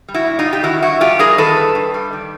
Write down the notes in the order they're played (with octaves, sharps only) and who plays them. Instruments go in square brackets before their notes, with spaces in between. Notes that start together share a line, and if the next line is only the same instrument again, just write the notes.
[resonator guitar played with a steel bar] G3
E4 F#4
A#2
D#4 F4
A#2
G4
D#3 E4 F#4
G2 E4 F#4
G2 F4 G4
G3 G#4 A#4
D#3 A4 B4
G2
G2
G3
D#3